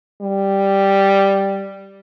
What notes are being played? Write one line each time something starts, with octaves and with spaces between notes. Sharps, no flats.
G3